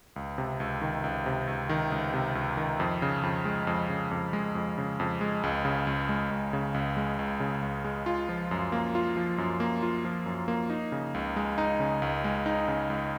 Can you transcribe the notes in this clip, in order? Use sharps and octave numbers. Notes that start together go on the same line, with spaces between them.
C#2
C3
C#2
D#3
C#2
C3
C#2
D#3
C#2
C3
C#2
D#3
F2
C#3
F2
G#3
F2
C#3
F2
G#3
F2
C#3
F2
G#3
C#2
C#3
C#2
G#3
C#2
C#3
C#2
G#3
C#2
C#3
C#2
G#3
F4
F3
F#2
A#3
F4
F3
F#2
A#3
F4
F3
F#2
A#3
D#4
C#3
C#2
G#3
D#4
C#3
C#2
G#3
D#4
C#3
C#2